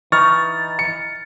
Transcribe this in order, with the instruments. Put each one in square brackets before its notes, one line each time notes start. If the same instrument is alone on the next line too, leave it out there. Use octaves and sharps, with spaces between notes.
[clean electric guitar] E3 D#4 [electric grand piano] C#6 F6 [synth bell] A6
[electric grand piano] C#7